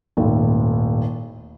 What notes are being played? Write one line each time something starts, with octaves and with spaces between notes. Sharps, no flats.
D#1 G#1 A2